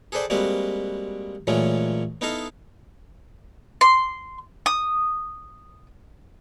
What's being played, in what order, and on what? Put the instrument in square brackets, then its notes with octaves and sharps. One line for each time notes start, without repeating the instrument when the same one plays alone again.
[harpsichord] G#4 A4 B4 C5 D5 G5
G3 G#3 A#3 C4 F#4 B4
A#2 E3 F#3 G#3 A3 C#4
B3 D#4 E4 A4 D#5 F5
[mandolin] C6
D#6